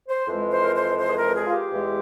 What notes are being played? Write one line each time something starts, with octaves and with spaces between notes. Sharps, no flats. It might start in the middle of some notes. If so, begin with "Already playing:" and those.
C5
F2 E3 G#3
C5
A#4
C5
C5
G#4
A#4
G#4
F4
G4
E2 E3 G#3